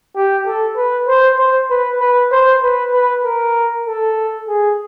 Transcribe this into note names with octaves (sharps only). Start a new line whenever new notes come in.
G4
A4
B4
C5
C5
B4
B4
C5
B4
B4
A#4
A4
G#4